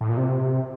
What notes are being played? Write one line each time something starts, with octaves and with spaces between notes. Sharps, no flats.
A2
A#2
C3